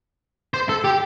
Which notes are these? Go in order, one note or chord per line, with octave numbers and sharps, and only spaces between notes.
C5
A4
G4